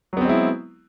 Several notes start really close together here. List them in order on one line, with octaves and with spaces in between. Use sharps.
F#3 B3 C4 G#3 E4